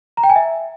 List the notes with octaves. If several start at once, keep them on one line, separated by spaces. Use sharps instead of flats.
A#5
G5
G#5
E5